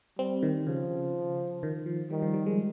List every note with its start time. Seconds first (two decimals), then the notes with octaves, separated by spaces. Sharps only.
0.18 G3 C4
0.43 D#3
0.66 C#3 F3
1.63 D#3
1.86 F3
2.10 D#3 G3
2.22 F3
2.34 G3
2.46 G#3